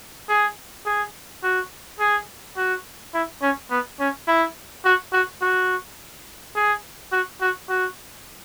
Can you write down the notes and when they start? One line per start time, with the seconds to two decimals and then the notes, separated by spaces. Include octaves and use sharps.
0.29 G#4
0.86 G#4
1.43 F#4
2.00 G#4
2.57 F#4
3.14 E4
3.42 C#4
3.71 B3
4.00 C#4
4.28 E4
4.85 F#4
5.13 F#4
5.42 F#4
6.56 G#4
7.12 F#4
7.41 F#4
7.69 F#4